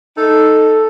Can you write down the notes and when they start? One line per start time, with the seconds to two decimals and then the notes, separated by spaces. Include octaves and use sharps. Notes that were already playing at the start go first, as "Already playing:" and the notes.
0.17 D#4 A4